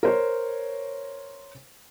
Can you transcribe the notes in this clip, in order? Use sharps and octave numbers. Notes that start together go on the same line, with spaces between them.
A#4 C5 C#5